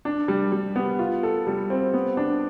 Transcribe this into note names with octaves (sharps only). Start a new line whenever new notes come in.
D4
G3
G3
B3
F4
A4
G3
C4
B3
D4